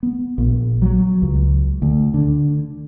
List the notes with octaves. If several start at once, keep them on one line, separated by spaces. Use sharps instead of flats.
B3
A#1
F#3
C#2
D2
D3